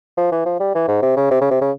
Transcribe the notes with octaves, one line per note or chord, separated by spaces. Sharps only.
F3
E3
F3
G3
E3
G#2
C3
C#3
C3
C#3
C3
C#3